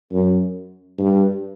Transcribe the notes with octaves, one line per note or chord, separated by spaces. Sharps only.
F#2
G2